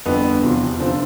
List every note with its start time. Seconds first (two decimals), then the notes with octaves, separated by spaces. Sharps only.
0.05 G1 F2 D3 B3
0.43 E2 C3 F3
0.80 F1 D3 F3 C4